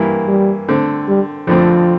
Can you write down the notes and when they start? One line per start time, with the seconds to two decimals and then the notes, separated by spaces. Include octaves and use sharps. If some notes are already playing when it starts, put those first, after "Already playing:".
Already playing: G2 E3 A#3 E4 G4
0.28 G3
0.68 D3 A3 C4
1.08 G3
1.47 F2 D3 F3 A3 C4